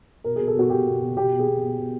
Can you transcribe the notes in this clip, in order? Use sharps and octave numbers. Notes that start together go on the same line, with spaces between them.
B2 A#4
B2 G#4
A4
B2 F#4
B2 G4
B2
B2
B2 G4
B2
G#4
B2
B2
B2